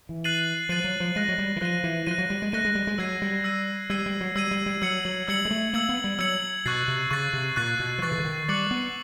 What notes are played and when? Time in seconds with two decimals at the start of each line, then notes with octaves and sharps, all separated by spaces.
0.09 E3
0.24 F#6 A6 C7 D#7 F#7
0.69 F3 F#6 A6 C7 D#7 F#7
0.84 F#3
1.00 F3
1.15 G#3 F#6 A#6 D#7
1.28 F#3
1.38 G3
1.56 E3
1.61 F3 F#6 A#6 D#7
1.84 E3
2.06 F3 F#6 A#6 D#7
2.18 F#3
2.30 G3
2.42 G#3
2.52 A3 F#6 A#6 D#7
2.65 G#3
2.75 G3
2.87 G#3
2.98 F#3 E6 G#6 C7 D#7
3.22 G3
3.44 E6 G#6 C7 D#7
3.90 G3 E6 G#6 C7 D#7
4.06 G3
4.21 F#3
4.35 G3 E6 G#6 C7 D#7
4.51 G3
4.66 G3
4.82 F#3 E6 G#6 C#7 F#7
5.05 F#3
5.28 G3 E6 G#6 C#7 F#7
5.45 G#3
5.51 A3
5.73 A#3 E6 G#6 C#7 F#7
5.89 B3
6.04 G3
6.19 F#3 E6 G#6 C#7 F#7
6.66 B2 C#6 F#6 A6 C7
6.88 C3
7.11 C#3 C#6 F#6 A6 C7
7.33 C3
7.56 A#2 C#6 F#6 A6 C7
7.80 B2
7.98 F3
8.02 E3 C#6 F#6 A6 C7
8.12 C#3
8.18 D3
8.25 D#3
8.48 G3 D6 F#6 A6 C#7 F#7
8.71 B3